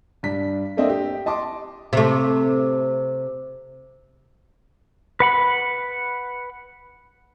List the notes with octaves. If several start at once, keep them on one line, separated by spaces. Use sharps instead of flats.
G2 D4 B6
A3 A#3 C4 D4 D#5 E5
G4
D#5 A5 C6 D6
C3 A3
B4 F#5 B5